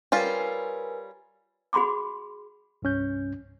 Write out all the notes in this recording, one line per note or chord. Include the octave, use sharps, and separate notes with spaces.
G3 C#4 F4 A#4 B4 G#5
F#4 G#4 B5 C6 D6
C2 G2 C#4 G6